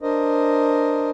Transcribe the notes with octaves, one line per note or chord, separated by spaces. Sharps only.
D4 A#4 C5 D#5